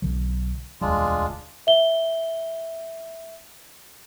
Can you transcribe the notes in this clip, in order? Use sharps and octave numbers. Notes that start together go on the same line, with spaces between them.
B1 D3 F#3
E1 D2 G3 G#3 D4 F4
E5 G7